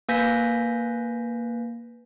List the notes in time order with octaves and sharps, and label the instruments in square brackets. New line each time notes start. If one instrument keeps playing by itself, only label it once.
[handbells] A#3 B4 G#5 G6 A#6 B6